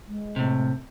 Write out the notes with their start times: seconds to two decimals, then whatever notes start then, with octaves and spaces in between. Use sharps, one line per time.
0.08 G#3
0.36 A2 C3